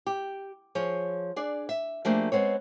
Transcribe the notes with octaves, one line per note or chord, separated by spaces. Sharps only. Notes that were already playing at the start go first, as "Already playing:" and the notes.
G4
F3 G#4 C#5
D4 G#4 D5
E5
F3 A3 A#3 D4 G4 G#4
G#3 B3 C4 C#5